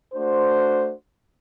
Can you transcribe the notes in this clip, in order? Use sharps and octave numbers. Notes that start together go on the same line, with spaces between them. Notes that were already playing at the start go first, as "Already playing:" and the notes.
A3 D4 F#4 C5